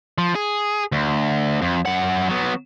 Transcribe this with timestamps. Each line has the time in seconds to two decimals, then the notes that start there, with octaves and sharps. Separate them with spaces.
0.18 F3
0.35 G#4
0.92 D2
1.61 F2
1.86 F#2 F#5
2.29 F#3 B3